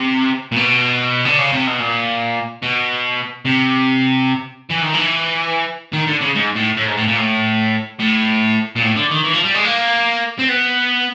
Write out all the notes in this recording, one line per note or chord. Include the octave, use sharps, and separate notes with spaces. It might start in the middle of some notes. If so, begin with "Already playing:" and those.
Already playing: C3
A#2
B2
D3
C#3
C3
B2
A#2
B2
C3
E3
D#3
E3
D#3
D3
C#3
G#2
A2
A2
G#2
A2
A#2
A2
A2
A#2
A2
D3
D#3
E3
F3
G3
G#3
A#3
C4
B3